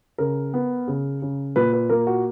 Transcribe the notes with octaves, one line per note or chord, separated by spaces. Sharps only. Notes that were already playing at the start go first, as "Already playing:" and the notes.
C#3 A#4
B3
C#3
C#3
A#2 B4
B4
A#3 A#4
F#4